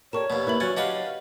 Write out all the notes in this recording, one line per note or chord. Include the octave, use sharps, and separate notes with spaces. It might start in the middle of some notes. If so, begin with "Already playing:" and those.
G4 A4 A#4 C#5 D5 C#6 E7
D#2 B2 B3
A#3 E4 B4 E5 F#7
F#3 C#4 F#4 G#6 A6 C#7
D4 G4 B4 D#5 F5 F#5 A6